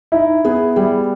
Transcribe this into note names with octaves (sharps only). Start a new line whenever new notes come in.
D#4 E4
B3 G#4
G3 G#4